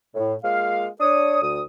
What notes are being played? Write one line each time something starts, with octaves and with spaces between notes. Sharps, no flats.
A2
G#3 A#3 F4 F5
D4 C#5 D#6
D2 D#6